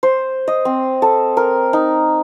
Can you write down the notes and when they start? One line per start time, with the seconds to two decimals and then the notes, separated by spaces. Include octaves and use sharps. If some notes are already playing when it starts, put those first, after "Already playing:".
0.03 C5
0.48 D#5
0.65 C4
1.02 A4
1.37 A#4
1.73 D#4